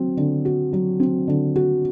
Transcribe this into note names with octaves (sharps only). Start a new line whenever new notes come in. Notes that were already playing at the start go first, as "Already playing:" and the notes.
Already playing: F#3 C4
D3
F#4
F#3
C4
D3
F#4